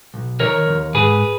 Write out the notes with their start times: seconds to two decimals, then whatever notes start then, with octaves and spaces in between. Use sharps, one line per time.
0.14 B1
0.40 D#3 A#4 C#5
0.68 D#2
0.94 G#2 G#4 B4